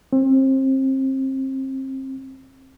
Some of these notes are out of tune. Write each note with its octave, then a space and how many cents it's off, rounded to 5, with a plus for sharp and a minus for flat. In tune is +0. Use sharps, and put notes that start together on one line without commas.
C4 +30